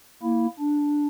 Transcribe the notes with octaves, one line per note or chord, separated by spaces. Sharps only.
A#3 E4
D4